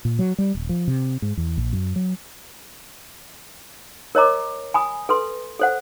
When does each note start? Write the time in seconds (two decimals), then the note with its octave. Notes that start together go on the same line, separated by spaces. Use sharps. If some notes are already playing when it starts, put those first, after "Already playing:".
0.05 A#2
0.19 F#3
0.38 G3
0.55 D#1
0.69 F3
0.88 C3
1.22 G#2
1.37 E2
1.57 A#1
1.73 F#2
1.96 F#3
4.15 A#4 C#5 D#5 A#5 D6
4.74 G#5 B5 D#6
5.09 A4 B4 C6
5.60 A4 C5 F#5